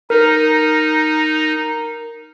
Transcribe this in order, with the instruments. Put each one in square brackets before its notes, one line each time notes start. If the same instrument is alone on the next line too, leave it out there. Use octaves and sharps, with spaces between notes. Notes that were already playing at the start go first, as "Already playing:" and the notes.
[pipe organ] D#4 [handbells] A#4